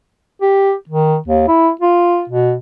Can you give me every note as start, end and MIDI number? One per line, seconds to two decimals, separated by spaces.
0.42 0.73 67
0.89 1.17 51
1.28 1.43 39
1.48 1.69 64
1.81 2.24 65
2.30 2.53 47